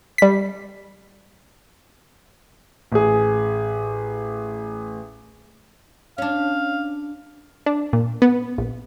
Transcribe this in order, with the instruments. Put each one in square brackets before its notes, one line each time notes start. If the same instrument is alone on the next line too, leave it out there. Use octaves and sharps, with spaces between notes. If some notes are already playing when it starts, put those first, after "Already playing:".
[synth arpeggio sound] G3 B6
[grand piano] A1 G#4
[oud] C#4 D4 [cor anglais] F5
[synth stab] D4
A#2
B3
A#1